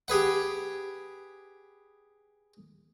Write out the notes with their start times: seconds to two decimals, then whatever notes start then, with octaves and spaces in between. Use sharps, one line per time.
0.08 G4 G#4 B4 F#5